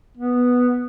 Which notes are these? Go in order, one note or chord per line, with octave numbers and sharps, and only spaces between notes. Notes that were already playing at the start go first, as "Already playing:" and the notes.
B3